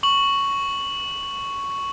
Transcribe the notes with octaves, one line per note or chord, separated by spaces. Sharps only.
C#6 F#7